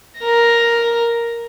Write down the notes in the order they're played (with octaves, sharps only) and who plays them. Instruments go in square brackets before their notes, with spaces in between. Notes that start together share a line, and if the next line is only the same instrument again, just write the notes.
[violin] A#4 A#6